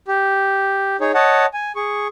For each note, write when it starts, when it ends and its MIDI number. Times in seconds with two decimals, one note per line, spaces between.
0.08 0.97 67
1.01 1.12 63
1.01 1.12 68
1.01 1.12 73
1.14 1.46 73
1.14 1.46 75
1.14 1.46 78
1.14 1.46 81
1.54 1.72 80
1.76 2.08 68
1.76 2.08 85